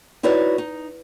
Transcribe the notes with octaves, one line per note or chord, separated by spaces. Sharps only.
D#4 E4 F#4 B4 C#5 D5
D#4